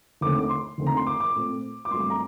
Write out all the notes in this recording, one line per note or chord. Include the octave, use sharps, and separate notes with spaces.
D#2 D3 A3 C4 D6
D6
C6
D#2 D3 A3 C4
A#5
C6
D6
D6
A#2 A3 C4
D6
G2 F#3 A3 C4 C6
D6
A#5